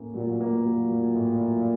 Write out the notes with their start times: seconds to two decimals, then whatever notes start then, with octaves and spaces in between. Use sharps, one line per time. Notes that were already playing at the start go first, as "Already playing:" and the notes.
Already playing: A2 A#3 C#4
0.15 A#2 F#3
0.41 A#3
0.65 F#3
0.91 F#3
1.15 A2
1.41 F#3